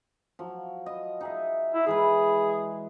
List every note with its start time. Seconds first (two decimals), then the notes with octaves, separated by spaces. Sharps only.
0.39 F3 F#3
0.86 D#5
1.21 D#4 G#4 E5
1.74 E4
1.87 E3 G#3 G#4 B4